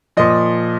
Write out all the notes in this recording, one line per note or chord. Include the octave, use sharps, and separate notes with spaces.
A#2 F3 D#5